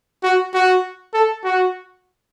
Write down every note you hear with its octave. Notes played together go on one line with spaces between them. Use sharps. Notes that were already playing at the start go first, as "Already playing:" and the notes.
F#4
F#4
A4
F#4